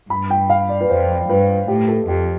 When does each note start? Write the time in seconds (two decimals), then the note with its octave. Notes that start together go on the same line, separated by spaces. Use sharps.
0.10 G2 B5
0.30 G5
0.50 F5
0.69 D5
0.81 B4
0.90 F2 C5
1.29 G2 B4
1.68 A2 G4
1.88 A4
2.08 F2 G4